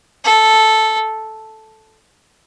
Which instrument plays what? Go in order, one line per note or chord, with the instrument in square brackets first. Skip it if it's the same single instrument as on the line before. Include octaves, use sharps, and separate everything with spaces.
[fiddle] A4